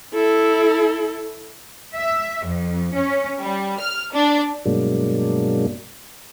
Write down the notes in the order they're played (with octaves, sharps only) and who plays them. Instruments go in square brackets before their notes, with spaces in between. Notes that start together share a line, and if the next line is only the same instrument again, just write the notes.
[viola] E4 A4
[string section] E5
F2
C#4
G3
F6
D4
[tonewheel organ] G2 B2 F#3 G#3 A#3 D4